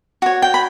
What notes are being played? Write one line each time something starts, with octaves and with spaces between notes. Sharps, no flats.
F#4 C#5
G5
B5